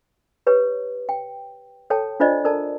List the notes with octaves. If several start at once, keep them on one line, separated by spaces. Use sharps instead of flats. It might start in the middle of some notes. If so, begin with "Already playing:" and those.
G4 B4 C#5
G5
A4 C#5 G5 A5
D4 F4 C5 D5 D#5
A4 A#4 D5 A5 A#5